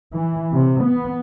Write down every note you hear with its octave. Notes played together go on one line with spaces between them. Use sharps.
E3
C3
B3